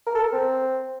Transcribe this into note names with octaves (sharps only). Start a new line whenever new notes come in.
A#4
A4
A#4
C4